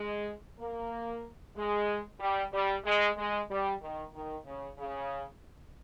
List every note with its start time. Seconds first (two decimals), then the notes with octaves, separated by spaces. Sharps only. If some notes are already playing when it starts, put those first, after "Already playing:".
Already playing: G#3
0.59 A#3
1.55 G#3
2.20 G3
2.52 G3
2.84 G#3
3.16 G#3
3.49 G3
3.81 D#3
4.13 D#3
4.45 C#3
4.78 C#3